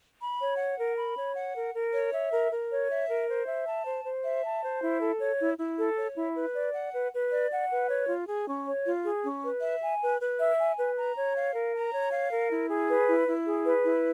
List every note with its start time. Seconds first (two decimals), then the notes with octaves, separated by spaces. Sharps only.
0.21 B5
0.40 C#5
0.58 F#5
0.78 A#4
0.97 B5
1.17 C#5
1.35 F#5
1.56 A#4
1.74 A#4
1.93 C#5
2.13 E5
2.32 A#4
2.52 A#4
2.71 C#5
2.89 E5
3.09 A#4
3.28 C5
3.47 E5
3.67 A5
3.85 C5
4.04 C5
4.24 E5
4.43 A5
4.62 C5
4.82 E4
5.01 A4
5.20 C#5
5.40 E4
5.59 E4
5.78 A4
5.97 C#5
6.16 E4
6.36 B4
6.54 D5
6.74 F#5
6.94 B4
7.13 B4
7.31 D5
7.51 F#5
7.70 B4
7.89 C#5
8.08 F4
8.27 G#4
8.47 C#4
8.66 C#5
8.86 F4
9.04 G#4
9.24 C#4
9.43 B4
9.62 E5
9.81 G#5
10.01 B4
10.20 B4
10.39 E5
10.59 G#5
10.78 B4
10.97 A#5
11.16 C#5
11.35 F5
11.54 A#4
11.74 A#5
11.92 C#5
12.12 F5
12.31 A#4
12.51 E4
12.69 G#4
12.89 B4
13.08 E4
13.27 E4
13.47 G#4
13.65 B4
13.85 E4